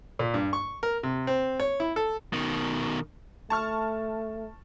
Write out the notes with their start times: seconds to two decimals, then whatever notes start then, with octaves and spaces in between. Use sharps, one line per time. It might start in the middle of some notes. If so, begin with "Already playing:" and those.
0.19 A#2
0.34 G2
0.53 C#6
0.83 A#4
1.03 C3
1.27 C4
1.60 C#5
1.80 E4
1.96 A4
2.33 B2 D#3
3.50 A3 A5 C#6 F6